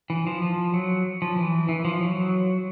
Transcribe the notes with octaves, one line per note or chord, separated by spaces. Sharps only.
E3
F3
F3
F#3
F3
E3
E3
F3
F#3